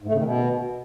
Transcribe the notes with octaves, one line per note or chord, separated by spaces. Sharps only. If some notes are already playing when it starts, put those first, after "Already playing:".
G#2
A3
C#3
D#3
B2